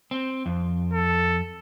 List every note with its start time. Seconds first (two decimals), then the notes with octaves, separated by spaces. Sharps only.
0.11 C4
0.46 F2
0.93 A4